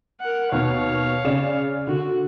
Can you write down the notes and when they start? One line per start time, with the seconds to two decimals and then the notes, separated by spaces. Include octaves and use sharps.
0.21 A#4 F#5
0.52 D#2 B2 C#5 F5
1.25 C#3 D5 E7
1.87 D3 F#4